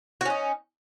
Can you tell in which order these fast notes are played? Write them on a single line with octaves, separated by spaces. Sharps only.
F#4 C#4 D#4